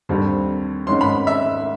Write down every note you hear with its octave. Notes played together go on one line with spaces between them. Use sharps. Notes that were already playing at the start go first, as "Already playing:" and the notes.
D#2 D3 G3 C4
G#2 D#3 G#3 C#4 C6
B5
E5